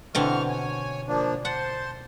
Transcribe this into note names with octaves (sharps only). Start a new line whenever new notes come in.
B2 D3 E3 C4 C#6 F6
C#5 G#5
F3 A#3 D4
C5 F#5 A5 C6